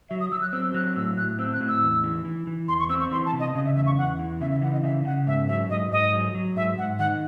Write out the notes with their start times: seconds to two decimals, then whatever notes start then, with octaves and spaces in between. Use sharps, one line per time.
0.10 F#3 E5
0.20 D#6
0.32 F#3 E6
0.42 F#6
0.53 C4 E6
0.74 F#3 F#6
0.96 A2 E6
1.17 A2 F#6
1.39 C4 E6
1.53 F#6
1.61 A2
1.68 E6
1.82 E2
2.04 E3
2.25 E3
2.47 E3
2.68 E2 C6
2.79 C#6
2.89 C4 E6
3.00 C#6
3.11 E3 C6
3.26 A5
3.33 C3
3.40 D#5
3.55 C#3 D#5
3.65 E5
3.76 E2 E5
3.86 C#6
3.98 E2 F#5
4.19 E3
4.41 C#3 E5
4.51 E5
4.62 E3 F#5
4.73 D#5
4.83 C#3 E5
5.05 C#3 F#5
5.27 G#2 E5
5.48 F#3 E5
5.69 G#2 D#5
5.91 G#2 D#5
6.13 F#3
6.35 F#3
6.56 G#2 E5
6.78 G#2 F#5
6.99 D#3 F#5